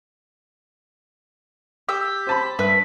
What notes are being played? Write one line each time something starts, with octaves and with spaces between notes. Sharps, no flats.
G4 E6 B6
C5 A5 B5
G2 B4 E5